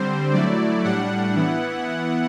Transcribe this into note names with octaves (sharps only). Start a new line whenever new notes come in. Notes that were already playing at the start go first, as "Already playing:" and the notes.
Already playing: D3 G3 C4 C5
F#3 A3 E4 D5
A2 G3 D4 F#5
E3 B3 E4
E3 B3 E4